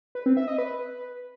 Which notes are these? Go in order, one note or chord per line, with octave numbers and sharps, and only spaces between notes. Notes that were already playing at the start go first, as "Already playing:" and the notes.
B4
C4
E5
D#5
B4